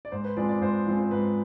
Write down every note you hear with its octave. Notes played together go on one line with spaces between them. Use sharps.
D5
G#2 C5
B4
F3 G#3 C4 D5
D5
G#2 C5
F3 G#3 C4
C5
G#2 B4